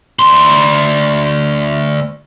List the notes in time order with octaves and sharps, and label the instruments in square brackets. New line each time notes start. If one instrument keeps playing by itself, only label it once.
[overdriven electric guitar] D2 C6